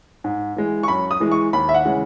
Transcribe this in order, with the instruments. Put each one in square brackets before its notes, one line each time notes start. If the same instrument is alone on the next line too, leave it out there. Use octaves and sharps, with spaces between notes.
[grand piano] G#2
E3 G#3
C#6
F#2 B5
D#6
E3 G#3
C#6
D#2 B5
E5
F#5
C#3 E3 G#3